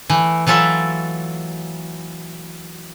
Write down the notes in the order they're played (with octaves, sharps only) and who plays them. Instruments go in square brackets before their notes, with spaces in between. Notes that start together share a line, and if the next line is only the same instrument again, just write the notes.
[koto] E3 A3
E3 F#3 F4 A4 E5